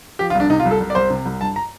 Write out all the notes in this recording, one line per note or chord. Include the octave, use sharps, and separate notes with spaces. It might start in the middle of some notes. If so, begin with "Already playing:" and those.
F3 G4
F4
C2 D4
C3 D#4
F4
C2
A4
C2
D5
C2 C5
C3
C2
G2 A5
A#5